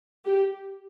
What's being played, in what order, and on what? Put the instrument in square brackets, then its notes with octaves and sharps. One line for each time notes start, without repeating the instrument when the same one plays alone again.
[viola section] G4